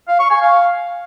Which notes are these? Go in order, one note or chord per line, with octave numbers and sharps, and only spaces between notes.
F5
C#6
G#5
F5